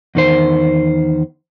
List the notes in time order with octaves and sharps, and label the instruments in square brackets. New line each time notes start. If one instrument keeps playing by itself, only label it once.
[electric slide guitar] E2 D#3 C5